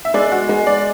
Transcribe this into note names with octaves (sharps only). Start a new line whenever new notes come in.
E5
G#3 D5
F#4
G#3
D5